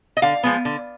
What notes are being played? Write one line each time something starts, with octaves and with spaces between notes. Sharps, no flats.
D#5
D3 F5
F3 G#3 B3
D3